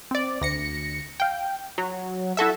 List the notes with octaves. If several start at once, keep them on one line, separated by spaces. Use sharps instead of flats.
C4 D5
D2 A#6 C#7
F5 G5
F#3
E4 F#4 A4 E5